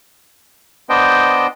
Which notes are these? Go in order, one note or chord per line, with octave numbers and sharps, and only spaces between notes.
B3 D4 C5 D#5 G5